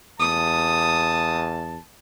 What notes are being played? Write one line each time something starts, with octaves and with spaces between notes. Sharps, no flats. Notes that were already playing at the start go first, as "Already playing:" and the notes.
E2 A5 D#6